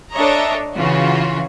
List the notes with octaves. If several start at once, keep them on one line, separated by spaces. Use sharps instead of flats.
D4 A4 C#5 D#5 E5 A#5
C#3 E3 F4 F#4